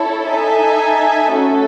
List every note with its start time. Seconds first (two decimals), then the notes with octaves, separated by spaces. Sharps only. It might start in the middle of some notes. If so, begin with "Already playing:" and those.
Already playing: E4 A4 C#5
0.28 D#4 A4 E5 G#5
1.31 A3 C#4 F#4 A4